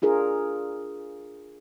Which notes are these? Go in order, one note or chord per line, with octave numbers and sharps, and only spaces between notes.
D4 F4 G#4 A#4